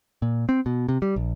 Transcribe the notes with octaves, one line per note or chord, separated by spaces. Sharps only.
A#2
C4
B2
C3
G3
A#1